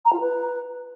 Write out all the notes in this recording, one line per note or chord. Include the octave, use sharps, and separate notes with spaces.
A#5
F4
B4